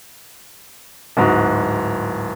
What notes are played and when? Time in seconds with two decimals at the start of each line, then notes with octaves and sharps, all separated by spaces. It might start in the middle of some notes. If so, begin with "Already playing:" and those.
1.17 D1 G#2 F#4